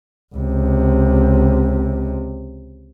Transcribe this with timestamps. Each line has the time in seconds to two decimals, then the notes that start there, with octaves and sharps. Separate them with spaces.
0.35 C#2 C3